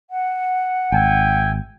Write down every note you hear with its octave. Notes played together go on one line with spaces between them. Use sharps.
F#5
G#1 E5 G5 G#5